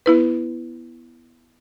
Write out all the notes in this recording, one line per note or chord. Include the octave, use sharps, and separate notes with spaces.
B3 E4 B4